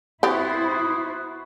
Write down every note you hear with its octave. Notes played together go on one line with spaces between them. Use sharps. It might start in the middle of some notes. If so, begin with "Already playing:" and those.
B3 C4 E4 F#4 G4 C5